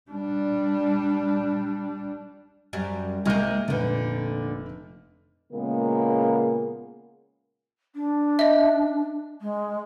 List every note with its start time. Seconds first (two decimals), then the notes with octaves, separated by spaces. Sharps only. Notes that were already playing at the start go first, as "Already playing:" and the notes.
0.11 G3 D4
2.73 F#2 G3
3.25 C2 G#3 A#3 F6 G6
3.68 F1 A#2 D3 B4
5.53 A#2 C#3 G#3 A#3 B3
7.95 D4
8.39 D#5 E5
9.41 G#3